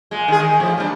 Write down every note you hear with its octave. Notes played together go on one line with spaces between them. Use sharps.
A#2 G#3
D#3 G#4
D#3
A2 F3
G3 A3 D4